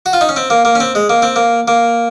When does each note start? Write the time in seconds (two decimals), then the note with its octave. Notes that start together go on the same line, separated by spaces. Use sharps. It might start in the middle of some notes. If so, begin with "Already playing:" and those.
0.06 F#4
0.13 F4
0.21 D#4
0.29 C#4
0.36 C4
0.50 A#3
0.65 A#3
0.75 C#4
0.80 C4
0.95 G#3
1.10 A#3
1.22 C4
1.36 A#3
1.68 A#3